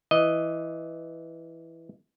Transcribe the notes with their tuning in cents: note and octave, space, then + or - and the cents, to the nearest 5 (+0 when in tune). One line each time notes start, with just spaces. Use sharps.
E3 +0 D#5 +0